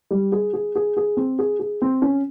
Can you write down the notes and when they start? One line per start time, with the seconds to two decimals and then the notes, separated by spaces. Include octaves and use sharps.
0.11 G3
0.32 G#4
0.53 G#4
0.75 G#4
0.97 G#4
1.17 C4
1.39 G#4
1.59 G#4
1.82 C4
2.02 C#4